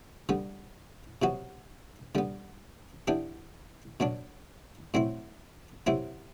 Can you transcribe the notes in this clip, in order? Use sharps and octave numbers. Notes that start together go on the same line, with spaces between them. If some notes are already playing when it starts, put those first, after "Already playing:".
D3 G3 B3
C3 F#3 B3 F#4
D3 G3 B3
E3 B3 D4 G4
B2 F#3 B3 D4
A2 F#3 C4 E4
C3 F#3 C4 E4